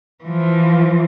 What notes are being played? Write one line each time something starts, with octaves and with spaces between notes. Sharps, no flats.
E3 F3